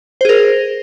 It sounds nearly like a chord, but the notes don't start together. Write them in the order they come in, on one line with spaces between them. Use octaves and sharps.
C5 G#4 A#4